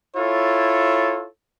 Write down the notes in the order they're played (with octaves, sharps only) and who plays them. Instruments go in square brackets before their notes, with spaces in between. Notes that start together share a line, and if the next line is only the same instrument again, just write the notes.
[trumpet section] E4 F4 A4 C#5